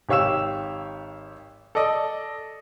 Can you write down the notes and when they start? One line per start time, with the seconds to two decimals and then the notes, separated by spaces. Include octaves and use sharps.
0.09 G#1 G4 C#5 F5 E6 E7
1.75 A4 D5 D#5